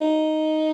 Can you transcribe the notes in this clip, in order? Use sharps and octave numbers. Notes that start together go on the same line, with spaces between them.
D#4